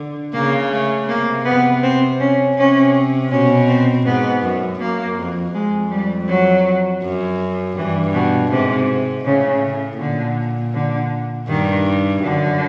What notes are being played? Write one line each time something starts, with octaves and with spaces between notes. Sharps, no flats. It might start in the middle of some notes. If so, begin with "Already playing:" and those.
Already playing: D3
C#3 A#3
A3
C3 A#3
B3
C4
C#4
C3 C#4
B2 C#4
C4
G#2 B3
F#2
F#2 A#3
F2
F2 G#3
G3
F#3
F#2
G2 E3
B2
G#2 C3
A2 C#3
A#2 D3
D3
G2 D#3
F#2 D3